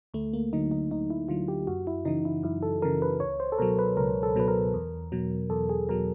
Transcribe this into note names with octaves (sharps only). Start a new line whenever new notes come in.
D2 A3
A#3
D3 F#3 D#4
D#4
D2 D#4
E4
D3 F#3 F4
G4
F#2 F#4
E4
C#3 E3 D#4
E4
F#2 E4
A4
C#3 E3 A#4
B4
C#2 C#5
C5
A4
B2 F#3 A#4
B4
C#2 A#4
A4
B2 F#3 B4
A#4
E2
B2 F#3
E2 A4
G#4
B2 F#3 A#4